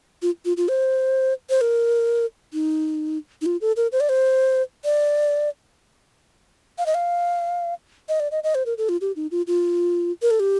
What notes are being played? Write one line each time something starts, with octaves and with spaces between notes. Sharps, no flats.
F4
F4
F4
C5
C5
A#4
D#4
D#4
F4
A4
A#4
C5
D5
C5
D5
F5
D#5
F5
D#5
D5
D#5
D#5
C5
A#4
A4
F4
G4
D#4
F4
F4
A#4
A4
G4